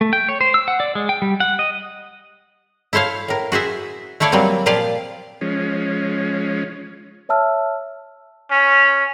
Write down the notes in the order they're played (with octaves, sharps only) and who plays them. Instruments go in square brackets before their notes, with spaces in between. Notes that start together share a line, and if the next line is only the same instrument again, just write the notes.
[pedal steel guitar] A3
G5
C#5
C5
E6
F#5
D5
G#3
G5
G3
F#5
D#5
[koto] E4 A4 C5 C#5 F5
A2 A#4
F#4 G#4 C5 E5
A3 E4 A4 C#5 D5 F5
F#3 G3 A#3 C4
A#2 F3 F4 G4 D5 F5
[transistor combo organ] F3 G#3 C#4
[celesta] C#5 E5 A5 E6 F6
[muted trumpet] C#4